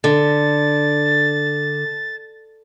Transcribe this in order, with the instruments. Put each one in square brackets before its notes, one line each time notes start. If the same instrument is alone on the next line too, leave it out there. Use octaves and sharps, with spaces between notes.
[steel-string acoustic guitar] D3 [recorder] A6